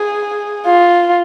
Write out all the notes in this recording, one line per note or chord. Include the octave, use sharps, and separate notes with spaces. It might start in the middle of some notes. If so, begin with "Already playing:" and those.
Already playing: G#4
F4